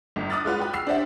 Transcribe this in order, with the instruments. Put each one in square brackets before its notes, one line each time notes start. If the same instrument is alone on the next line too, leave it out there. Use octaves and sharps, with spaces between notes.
[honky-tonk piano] G1
D6 D#6 F6 F#6 A6
G#3 F4 B4 F#5
F#4 G5 B5
E6 F6 C7
D4 G4 C5 D5 E5 F#5